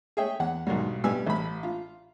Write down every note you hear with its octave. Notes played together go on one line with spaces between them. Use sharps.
G#4 C#5 E5 G5
E2 F#5
B1 G#2 D#3 F#3 G3
B2 G3 G4 B4 G#5 E6
A1 B5
F4